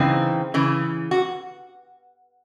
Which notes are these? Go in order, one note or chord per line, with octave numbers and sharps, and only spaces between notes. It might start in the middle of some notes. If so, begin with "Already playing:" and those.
Already playing: C#3 E3 C4 D#4
C#3 E3
F#4